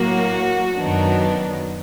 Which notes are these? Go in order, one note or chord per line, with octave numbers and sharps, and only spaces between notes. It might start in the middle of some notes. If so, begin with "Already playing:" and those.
Already playing: A2 F#3 A#3 F#4
F#2 D#3 F#3 B3 D4